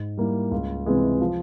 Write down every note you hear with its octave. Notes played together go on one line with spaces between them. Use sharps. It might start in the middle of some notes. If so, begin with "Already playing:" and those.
Already playing: G#2
G3 A#3 E4
C#2
C3 E3 G#3
F3